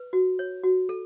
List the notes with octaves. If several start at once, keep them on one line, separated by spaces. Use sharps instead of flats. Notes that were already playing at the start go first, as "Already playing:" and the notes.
Already playing: B4
F#4
C#5
F#4
A4